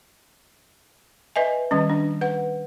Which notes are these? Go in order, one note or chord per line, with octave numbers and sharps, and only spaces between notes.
B4 D#5 E5 G#5
D#3 G3 C#4
D4
B4 F#5